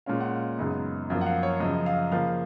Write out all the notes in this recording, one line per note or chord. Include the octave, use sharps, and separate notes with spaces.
A#2 G#3 C#4 F5
F#5
F5
F#2 C#3 G#3 B3 D#4
F#2 F3 A#3 F5
F#5
F5
C#5
F#2 C#3 F3 D#5
F5
C#3 F3 A#3 F5